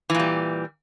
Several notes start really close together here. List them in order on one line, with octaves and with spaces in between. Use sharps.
E3 A#2 G3